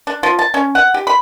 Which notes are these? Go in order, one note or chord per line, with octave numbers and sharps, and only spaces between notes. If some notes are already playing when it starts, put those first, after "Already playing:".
D4
F3
A5
C#4
F#5
G4
B5